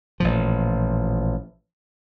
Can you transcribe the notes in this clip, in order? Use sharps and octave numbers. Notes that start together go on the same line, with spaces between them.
A1 A#2 F3